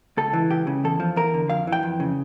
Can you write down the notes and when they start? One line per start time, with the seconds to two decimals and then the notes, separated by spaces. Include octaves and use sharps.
0.17 C#2 A4
0.33 E3
0.50 C#2 G4
0.67 C#3
0.84 E2 A4
1.00 F3
1.16 E2 A#4
1.34 D3
1.50 F2 F5
1.67 E3
1.72 G5
1.83 F2
2.00 C#3